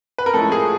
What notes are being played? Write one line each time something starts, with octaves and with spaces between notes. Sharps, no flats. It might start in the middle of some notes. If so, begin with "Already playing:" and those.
B4
A#4
A2 F3 G#3 C#4 E4 A4
G#4